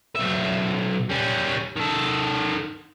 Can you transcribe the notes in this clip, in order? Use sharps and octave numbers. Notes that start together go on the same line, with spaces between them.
B1 E5
G3 C#4
D#3 A4